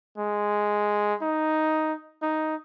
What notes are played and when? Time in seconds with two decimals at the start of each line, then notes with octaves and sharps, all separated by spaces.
0.18 G#3
1.22 D#4
2.22 D#4